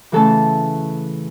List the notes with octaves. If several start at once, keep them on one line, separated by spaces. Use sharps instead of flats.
C#3 E3 A3 C#4 A4 A5